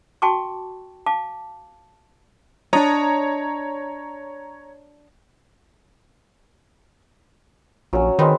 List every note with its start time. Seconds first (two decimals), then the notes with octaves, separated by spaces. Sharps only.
0.22 F#4 G5 A5 C#6 D6
1.06 F5 A5 D6
2.73 D4 C#5 D#5 A#5
7.93 A#1 F#3 C#4
8.19 D#3 G#3 C4 B4